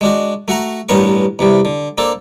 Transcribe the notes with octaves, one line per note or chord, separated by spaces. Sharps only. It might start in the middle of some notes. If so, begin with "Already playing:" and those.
G#3 D4 F#4
A3 F#4 F#5 A#5
A1 G2 B3 C#4 A#4 C#6
E2 C3 G3
D3
A#3 C4 D4 A4